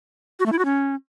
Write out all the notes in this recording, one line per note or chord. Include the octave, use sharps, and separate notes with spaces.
F#4
A3
E4
F#4
C#4